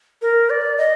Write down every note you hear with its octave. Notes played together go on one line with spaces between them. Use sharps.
A#4
D5
D#5